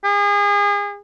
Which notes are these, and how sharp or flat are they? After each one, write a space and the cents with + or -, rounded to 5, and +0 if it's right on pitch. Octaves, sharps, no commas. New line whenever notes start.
G#4 -35